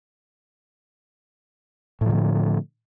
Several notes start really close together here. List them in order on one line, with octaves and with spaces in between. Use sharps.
A2 F3 D#3 D3